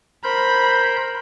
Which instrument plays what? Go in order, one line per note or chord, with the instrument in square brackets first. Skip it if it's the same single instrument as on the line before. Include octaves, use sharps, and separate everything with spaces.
[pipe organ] A#4 C5 G6 [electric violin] B5